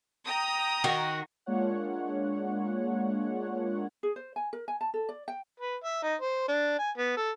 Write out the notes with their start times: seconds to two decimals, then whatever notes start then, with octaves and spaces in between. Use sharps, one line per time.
0.23 G5 A#5 D#6
0.84 D#3 F#4
1.46 G#3 A#3 D4 F4 C#5 F#5
4.03 G#4
4.16 C5
4.36 G#5
4.53 A#4
4.68 G#5
4.81 A5
4.94 A4
5.09 D5
5.28 G5
5.60 B4
5.84 E5
6.03 D#4
6.21 C5
6.48 D4
6.79 G#5
6.98 B3
7.17 A4